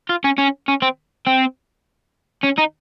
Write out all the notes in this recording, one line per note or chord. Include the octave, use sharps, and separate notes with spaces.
F4
C#4
C#4
C#4
C4
C4
C#4
D#4